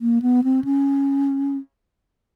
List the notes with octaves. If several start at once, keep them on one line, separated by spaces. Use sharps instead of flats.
A#3
B3
C4
C#4